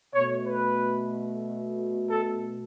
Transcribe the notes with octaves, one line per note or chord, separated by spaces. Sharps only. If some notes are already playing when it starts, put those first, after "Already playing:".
B2 A3 C#5
B4
A4